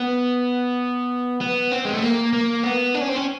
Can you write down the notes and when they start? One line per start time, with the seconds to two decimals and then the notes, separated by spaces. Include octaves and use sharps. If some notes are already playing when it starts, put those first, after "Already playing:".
Already playing: B3
1.41 B3
1.71 C4
1.85 G#3
1.94 A3
2.02 A#3
2.33 A#3
2.64 B3
2.94 D4
3.01 C#4
3.09 C4
3.16 C#4